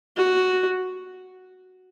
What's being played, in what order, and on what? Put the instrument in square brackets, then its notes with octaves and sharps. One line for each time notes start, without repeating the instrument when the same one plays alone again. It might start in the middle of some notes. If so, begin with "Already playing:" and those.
[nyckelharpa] F#4